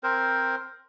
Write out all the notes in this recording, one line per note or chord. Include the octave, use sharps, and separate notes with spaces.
C4 A#4 C5